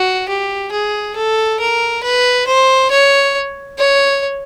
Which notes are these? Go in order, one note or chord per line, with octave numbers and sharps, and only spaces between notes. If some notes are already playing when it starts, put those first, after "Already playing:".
Already playing: F#4
G4
G#4
A4
A#4
B4
C5
C#5
C#5